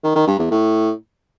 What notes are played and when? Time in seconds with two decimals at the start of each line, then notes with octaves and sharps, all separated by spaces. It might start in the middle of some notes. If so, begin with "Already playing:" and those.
0.03 D#3
0.15 D#3
0.27 G2
0.39 E2
0.51 A2